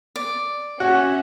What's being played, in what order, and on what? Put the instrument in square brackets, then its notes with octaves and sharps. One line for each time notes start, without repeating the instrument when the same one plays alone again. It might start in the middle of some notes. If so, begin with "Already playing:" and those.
[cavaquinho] D5
[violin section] C#4 E5 F#5 [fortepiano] F#4